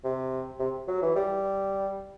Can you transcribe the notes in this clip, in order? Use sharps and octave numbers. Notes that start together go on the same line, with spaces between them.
C3
C3
F#3
E3
G3